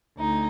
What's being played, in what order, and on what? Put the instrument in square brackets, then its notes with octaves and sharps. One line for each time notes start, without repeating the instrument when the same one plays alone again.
[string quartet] D2 D#4